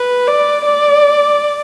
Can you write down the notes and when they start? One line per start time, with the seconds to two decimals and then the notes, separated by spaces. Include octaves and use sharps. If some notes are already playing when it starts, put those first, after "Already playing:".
Already playing: B4
0.28 D5
0.66 D5